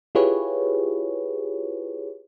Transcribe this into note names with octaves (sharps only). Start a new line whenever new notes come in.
E4 F4 G4 G#4 B4 C#5